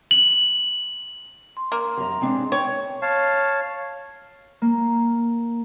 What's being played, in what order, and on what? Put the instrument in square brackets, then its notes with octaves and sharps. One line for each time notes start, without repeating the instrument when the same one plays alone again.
[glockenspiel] F#7
[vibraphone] C6
[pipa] A#3
[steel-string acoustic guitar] F#2 A#5
G#3 C4 D4
[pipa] C#5 [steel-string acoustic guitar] G5
[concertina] C#5 F5 A5
[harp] A#3